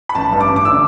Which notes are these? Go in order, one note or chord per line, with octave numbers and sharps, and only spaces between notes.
B5
A1 A5
G2
D6
A1
D6
D3 E6